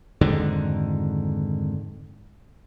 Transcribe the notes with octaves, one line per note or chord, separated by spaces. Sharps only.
F2 G#2 D3 D#3